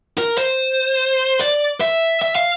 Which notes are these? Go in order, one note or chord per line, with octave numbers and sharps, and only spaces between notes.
A#4
C5
D5
E5
E5
F5